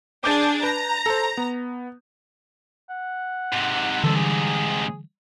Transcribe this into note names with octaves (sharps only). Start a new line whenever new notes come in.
D4 G#4 D6 G6 A6
B4 A#5
A4 C5
B3
F#5
G#2 C3
D3 E3 G3 A4
G#4